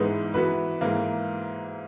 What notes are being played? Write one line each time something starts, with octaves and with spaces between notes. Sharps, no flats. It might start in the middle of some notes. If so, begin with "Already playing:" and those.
Already playing: G#2 E3 G#3 B3 D#4
E3 B3 F#4 B4
G#2 E3 A#3